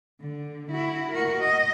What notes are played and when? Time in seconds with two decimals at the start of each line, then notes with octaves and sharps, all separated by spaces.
0.21 D3
0.71 E4 F#4
1.12 F#4 A#4
1.40 D#5